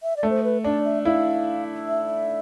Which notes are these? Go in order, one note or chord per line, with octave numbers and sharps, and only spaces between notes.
E5
D5
A3
C5
B4
D4 D5
E5
E4 F5
E5